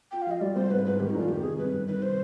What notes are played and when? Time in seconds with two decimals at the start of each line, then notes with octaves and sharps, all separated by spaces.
0.11 F4 G5
0.22 F5
0.27 F3 D#5
0.41 G3 D5
0.55 C2 C5
0.70 G#2 B4
0.85 G#2 B4
1.00 D#3 G4
1.10 D#4
1.15 F1 F4
1.28 D#3 G4
1.43 C3 G#4
1.58 G1 B4
1.73 G1
1.87 D#3 B4
2.02 C3 C5